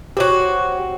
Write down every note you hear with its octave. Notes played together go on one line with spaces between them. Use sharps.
C4 F#4 G4 C5 C#5